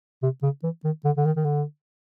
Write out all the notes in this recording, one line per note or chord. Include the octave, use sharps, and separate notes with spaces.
C3
C#3
E3
D#3
D3
D3
D#3
D#3
D3